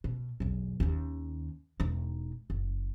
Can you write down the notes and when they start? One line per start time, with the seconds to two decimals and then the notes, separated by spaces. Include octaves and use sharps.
0.04 B2
0.40 B1 E2
0.80 D#2 C#4
1.80 E1 D#4
2.50 F#1